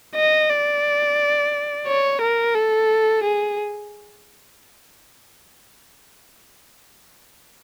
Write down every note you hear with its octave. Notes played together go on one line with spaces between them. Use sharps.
D#5
D5
C#5
A#4
A4
G#4